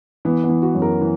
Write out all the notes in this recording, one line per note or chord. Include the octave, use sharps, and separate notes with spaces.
E3 B3
B3
E3
F#4
F#2
A#4
E3